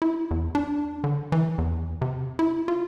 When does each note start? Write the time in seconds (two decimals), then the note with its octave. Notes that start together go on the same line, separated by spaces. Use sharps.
0.02 E4
0.31 E2
0.55 D4
1.04 D3
1.32 E3
1.58 E2
2.02 C3
2.39 E4
2.68 F4